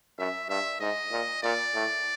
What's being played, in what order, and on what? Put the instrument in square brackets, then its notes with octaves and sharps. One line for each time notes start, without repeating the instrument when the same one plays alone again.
[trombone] F#2 [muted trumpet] E5
[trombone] G2 [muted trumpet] E5
[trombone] G#2 [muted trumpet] D#5
[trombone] A#2
[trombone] A#2 [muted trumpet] D5
[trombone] A2